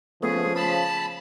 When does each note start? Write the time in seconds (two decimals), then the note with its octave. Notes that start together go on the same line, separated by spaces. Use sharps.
0.23 C#3 F3 A3 B3 G#4
0.56 A5 B5